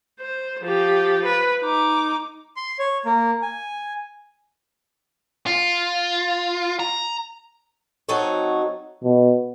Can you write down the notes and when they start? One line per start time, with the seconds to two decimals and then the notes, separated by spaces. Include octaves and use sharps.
0.20 C5
0.63 F3 G4
1.25 B4
1.63 D#4 D6
2.56 C6
2.79 C#5
3.05 A#3
3.42 G#5
5.47 F4
6.79 A#5
8.09 F#3 C4 D#4 F#4 A4 C#5
9.04 B2